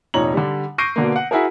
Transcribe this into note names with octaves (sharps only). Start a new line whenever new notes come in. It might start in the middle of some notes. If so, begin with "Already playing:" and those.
F1 A#2 D#4 C#5 A#5 F#7
D3 G3
C#6 G6 A#6 C7 D7 D#7
B2 D3 A#3
F#5
E4 F#4 G#4 A#4